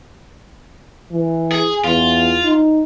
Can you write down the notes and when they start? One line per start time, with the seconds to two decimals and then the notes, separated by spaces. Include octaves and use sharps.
1.12 E3
1.52 G#4
1.84 E2 F4
2.44 D#4